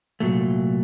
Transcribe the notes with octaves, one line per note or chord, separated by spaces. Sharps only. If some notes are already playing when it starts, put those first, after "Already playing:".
C2 A#2 F#3 A3